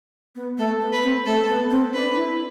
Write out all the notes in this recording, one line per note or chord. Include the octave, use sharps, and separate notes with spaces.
B3
A3 A4
B3
B4
C4
A3 A4
B3
C4
D4 B4
E4